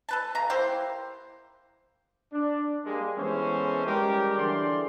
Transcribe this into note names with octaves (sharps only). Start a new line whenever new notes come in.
A4 B4 A5
C#3 A#5
A#3 E4 G4 C5
D4
G3 G#3 A#3
E3 G#3 B3 C#4 A4 C5
G3 G#3 C#4 G4 A#4
D3 E3 G#4 D5 C6